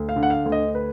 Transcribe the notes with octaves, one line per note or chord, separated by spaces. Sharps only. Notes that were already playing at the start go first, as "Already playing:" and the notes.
Already playing: D2
F5
D3
F#5
F5
D2
D#5
B4